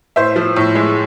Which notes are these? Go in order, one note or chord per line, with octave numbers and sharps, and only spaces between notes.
A2 C5 E5
F3
A2
G#3